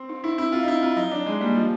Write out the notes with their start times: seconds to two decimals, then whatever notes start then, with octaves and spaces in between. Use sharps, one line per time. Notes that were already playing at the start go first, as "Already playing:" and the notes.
Already playing: C4
0.09 D#4
0.24 D#4 E4
0.38 C4 E4
0.52 C4 F4
0.63 D#4
0.68 C4 E4
0.83 C4 F4
0.96 F#3 D#4
1.11 F#3 D4
1.26 F#3 G#3
1.41 G3 A#3
1.55 F3 G4